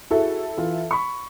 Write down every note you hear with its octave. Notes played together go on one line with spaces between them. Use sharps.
E4 F#4 G#4 A4
E3 F4
B5 C#6